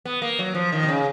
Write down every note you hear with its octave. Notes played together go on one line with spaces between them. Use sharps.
B3
A#3
F#3
F3
D#3
B2
C#3